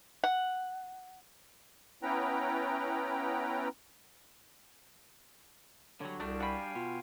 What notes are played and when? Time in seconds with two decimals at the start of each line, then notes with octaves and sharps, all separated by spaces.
0.24 F#5
2.03 B3 C#4 E4 B4 G5 A#5
6.01 D3 F#3 G3 C#5
6.20 C2 G3 A3 D4 F#4
6.40 F#4 F5 G5 G#5 B5
6.75 B2 F4